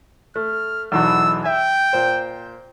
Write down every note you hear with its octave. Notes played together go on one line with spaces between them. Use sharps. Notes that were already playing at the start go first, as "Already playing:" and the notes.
A3 F6
B1 E2 B2 E6
E5 G5
A#2 C5